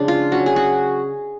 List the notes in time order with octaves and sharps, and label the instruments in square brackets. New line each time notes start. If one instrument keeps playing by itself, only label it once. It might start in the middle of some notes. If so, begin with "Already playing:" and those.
Already playing: [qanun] C#3 F3 G#3 D4
F4
F#3 C#4 F#4
G#4
F#4